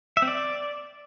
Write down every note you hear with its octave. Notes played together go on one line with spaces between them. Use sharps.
E5
C4
D5